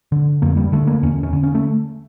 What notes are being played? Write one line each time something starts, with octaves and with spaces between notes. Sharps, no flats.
D3
F2 A#3
G3
D3 A3
A#3
E2 C#4
C#4
D3
C#4
A3